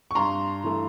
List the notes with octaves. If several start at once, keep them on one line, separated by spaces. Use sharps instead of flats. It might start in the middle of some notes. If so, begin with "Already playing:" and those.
C#6
G2 A#5 C6
E3 A3